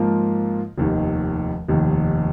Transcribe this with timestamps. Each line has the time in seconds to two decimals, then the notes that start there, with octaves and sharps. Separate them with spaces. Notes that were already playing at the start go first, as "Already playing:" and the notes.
Already playing: G#2 F3 A#3 F4
0.78 F1 D#2 D#3
1.69 F1 D#2 D#3